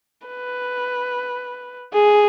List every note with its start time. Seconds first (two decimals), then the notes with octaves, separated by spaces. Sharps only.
0.28 B4
1.93 G#4